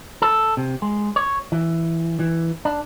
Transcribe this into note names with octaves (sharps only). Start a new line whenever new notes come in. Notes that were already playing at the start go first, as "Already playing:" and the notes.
A4
C3
G#3
C#5
E3
E3
D4